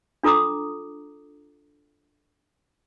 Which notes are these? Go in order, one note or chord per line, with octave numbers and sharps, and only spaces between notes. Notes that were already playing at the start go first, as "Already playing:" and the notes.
D4 F4 A4 A#5 D6 D#6